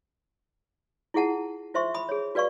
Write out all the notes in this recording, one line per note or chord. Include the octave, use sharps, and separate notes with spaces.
E4 F4 G#4 F#5 A5
F4 C5 E5 C6 C#6
B5 D#6
G#4 C#5
F#4 B4 D5 F5 C#6